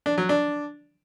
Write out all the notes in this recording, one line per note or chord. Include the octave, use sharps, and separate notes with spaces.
D4
F#3
D4